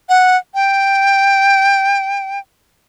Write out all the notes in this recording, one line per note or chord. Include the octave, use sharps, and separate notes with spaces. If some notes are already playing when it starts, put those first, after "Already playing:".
F#5
G5